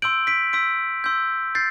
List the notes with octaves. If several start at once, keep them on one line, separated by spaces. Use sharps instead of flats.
C6 E6 G6 D7 F#7
B6 D7
C6 E6 G6 B6 D7
C6 E6 G6
G6 A6 C7